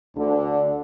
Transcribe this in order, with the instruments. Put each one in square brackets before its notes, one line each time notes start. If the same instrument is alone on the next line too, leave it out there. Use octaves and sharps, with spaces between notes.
[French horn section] D2 D3